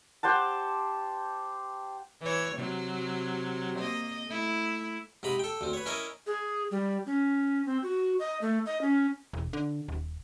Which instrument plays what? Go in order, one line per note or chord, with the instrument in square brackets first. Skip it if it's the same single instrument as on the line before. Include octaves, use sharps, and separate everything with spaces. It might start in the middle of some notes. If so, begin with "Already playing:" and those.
[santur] G4 C5 F#5 A5
[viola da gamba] E3 C#5
C3 F#3
A#3 D#5
A3 E4
[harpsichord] G#2 C3 A#5 B5 D#6
A4 G5
D2 C4
B4 C#5
C#4 E4 A#4 C#5 D#5
[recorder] G#4
G3
C#4
C4
F#4
D#5
A3
D#5
C#4
[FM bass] E1
D3
D#1